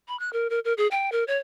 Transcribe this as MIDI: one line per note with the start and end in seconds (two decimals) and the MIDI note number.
0.08 0.18 83
0.19 0.30 90
0.33 0.47 70
0.50 0.60 70
0.65 0.73 70
0.77 0.87 68
0.91 1.10 79
1.12 1.24 70
1.27 1.38 73